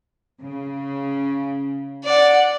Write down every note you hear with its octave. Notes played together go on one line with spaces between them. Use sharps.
C#3
D5 F#5